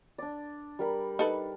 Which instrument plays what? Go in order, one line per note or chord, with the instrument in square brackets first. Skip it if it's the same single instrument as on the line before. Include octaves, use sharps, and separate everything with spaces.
[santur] D4 D5
G3 A#4 B5
[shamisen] D#4 A4 B4